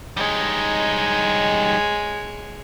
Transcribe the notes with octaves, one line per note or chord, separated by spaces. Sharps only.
G3 G#3 D#4 C#5